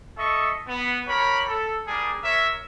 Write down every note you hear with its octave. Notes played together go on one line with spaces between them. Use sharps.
A4 D#5 E5 C#6
B3
G4 A#4 C#5 B5
A4
G3 A#3 D4 G#4
A#4 C#5 E5